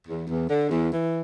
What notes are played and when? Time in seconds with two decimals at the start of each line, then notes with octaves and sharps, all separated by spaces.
0.07 E2
0.27 E2
0.48 D3
0.69 E2
0.90 E3